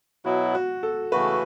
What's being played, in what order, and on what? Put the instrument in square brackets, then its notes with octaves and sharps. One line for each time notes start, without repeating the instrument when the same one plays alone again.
[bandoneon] B2 F#3 B3 E4 [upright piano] F#4
[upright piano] F#4
A4
[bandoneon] C#3 E3 A3 F#4 [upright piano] B4